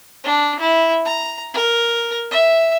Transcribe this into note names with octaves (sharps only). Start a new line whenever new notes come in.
D4
E4
A#5
A#4
E5